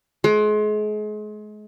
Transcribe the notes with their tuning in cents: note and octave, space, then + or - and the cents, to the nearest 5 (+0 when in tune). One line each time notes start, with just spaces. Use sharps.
G#3 +35